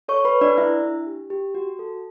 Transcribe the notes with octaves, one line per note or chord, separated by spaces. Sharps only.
A4 C#5 C#6
B4 B5
A4
D4 D5
D4 E4 E5
D4
G4
G4
F#4
A4